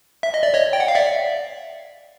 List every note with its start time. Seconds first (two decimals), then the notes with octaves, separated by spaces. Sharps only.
0.23 E5
0.34 D#5
0.43 D5
0.54 C#5 D#5
0.73 G5
0.80 F#5
0.88 F5
0.95 D5 E5